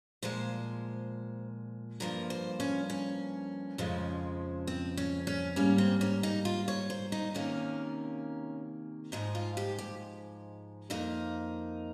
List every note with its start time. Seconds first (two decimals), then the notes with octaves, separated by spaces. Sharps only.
0.22 A#2 F3 G#3 C5
2.00 G2 F3 A#3 A#4
2.30 C5
2.60 C#4
2.90 C#4
3.78 F2 C#3 F3 G#3
4.67 C4
4.97 C#4
5.27 C#4
5.56 G#2 G3 A#3 C#4
5.78 C4
6.01 C#4
6.23 D#4
6.45 F4
6.68 C#5
6.90 C5
7.12 D#4
7.34 C3 D#3 A#3 C#4
9.12 G#2 F3 G#3 D#4
9.35 F4
9.57 G4
9.79 G4
10.90 F2 D#3 A#3 D#4